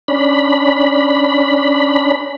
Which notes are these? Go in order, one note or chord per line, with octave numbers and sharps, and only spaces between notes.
C#4 D4 B5